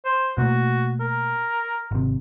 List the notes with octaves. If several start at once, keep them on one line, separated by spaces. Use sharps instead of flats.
C5
B2 A3 A#3 F#4
A#4
G#1 C3